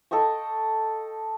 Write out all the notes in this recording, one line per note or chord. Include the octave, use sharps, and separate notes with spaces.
A4 D#5 G5 C#6